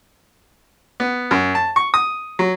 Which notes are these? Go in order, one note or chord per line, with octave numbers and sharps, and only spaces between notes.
B3
F#2
A5
C#6
D#6
F#3